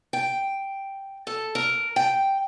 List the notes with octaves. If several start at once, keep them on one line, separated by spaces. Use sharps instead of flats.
G5
A4
A#4
G5